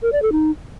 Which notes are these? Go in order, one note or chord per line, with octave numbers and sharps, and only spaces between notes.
A#4
D5
A4
D#4